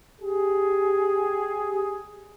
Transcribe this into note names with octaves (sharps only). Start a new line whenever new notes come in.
G4 G#4